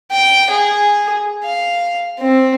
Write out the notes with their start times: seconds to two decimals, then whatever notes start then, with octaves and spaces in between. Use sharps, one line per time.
0.11 G5
0.50 G#4
1.45 F5
2.20 C4